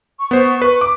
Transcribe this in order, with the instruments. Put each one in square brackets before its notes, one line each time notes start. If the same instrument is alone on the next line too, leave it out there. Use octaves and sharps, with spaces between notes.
[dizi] C#6
[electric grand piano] B3 C5
B4
D6